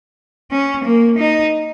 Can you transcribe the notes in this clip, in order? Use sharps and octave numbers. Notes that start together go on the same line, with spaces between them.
C#4
A#3
D#4